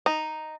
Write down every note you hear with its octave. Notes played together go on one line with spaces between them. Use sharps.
D#4